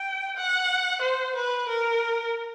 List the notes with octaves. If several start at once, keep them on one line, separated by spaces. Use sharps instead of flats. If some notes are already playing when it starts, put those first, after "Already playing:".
Already playing: G5
F#5
C5
B4
A#4